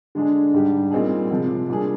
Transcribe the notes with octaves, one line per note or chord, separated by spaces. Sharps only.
D3 G#3 D4 G#4
G#2 G3 D4 G4
A#2 G3 C4 D#4 G#4
C3 F3 G#3 C4
A#2 G3 D4 G#4